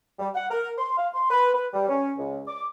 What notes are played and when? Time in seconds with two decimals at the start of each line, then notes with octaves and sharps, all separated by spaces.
0.19 G3
0.35 F#5
0.50 A#4
0.78 C6
0.98 F5
1.14 C6
1.31 B4
1.54 B4
1.73 G3
1.89 C#4
2.18 C#2
2.48 D6